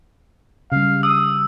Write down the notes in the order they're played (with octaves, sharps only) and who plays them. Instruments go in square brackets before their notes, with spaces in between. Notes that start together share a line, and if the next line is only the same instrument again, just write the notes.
[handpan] C#3 G3 [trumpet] F5
[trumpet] D#6 [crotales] E6